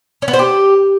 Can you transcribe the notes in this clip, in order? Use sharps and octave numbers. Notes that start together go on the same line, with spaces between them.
C#4
B3
C5
G4